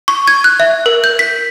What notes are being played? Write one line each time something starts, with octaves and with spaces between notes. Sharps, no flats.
C#6
G#6
F#6
E5
A#4
G6
B6